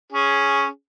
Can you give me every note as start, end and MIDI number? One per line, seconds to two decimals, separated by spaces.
0.12 0.67 61
0.12 0.67 68